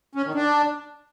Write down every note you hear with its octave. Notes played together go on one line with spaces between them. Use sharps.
C#4
D#3
D4